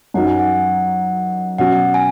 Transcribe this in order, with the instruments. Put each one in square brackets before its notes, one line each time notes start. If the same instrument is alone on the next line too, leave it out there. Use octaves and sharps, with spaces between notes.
[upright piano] F#2 F#3 D#4 F#4 [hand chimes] F#5
[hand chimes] G#5
F#5
[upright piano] B2 F#3 C#4 F#4 [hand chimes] F#5
[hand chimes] G#5